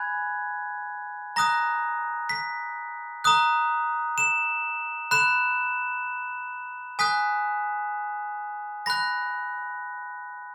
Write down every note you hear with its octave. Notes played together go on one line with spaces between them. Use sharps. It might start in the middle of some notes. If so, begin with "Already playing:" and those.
Already playing: G#5 B5 F#6 G#6
A#5 D#6 F#6 A#6
B6
A#5 D#6 F#6
E7
B5 F#6 E7
G#5 D#6 F#6 B6
B5 F#6 A#6